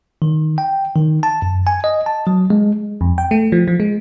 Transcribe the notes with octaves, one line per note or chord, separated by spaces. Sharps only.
D#3
G5
D#3
A5
F#2
G#5
D#5
A5
F#3
G#3
F2
G5
A3
F3
F3
G#3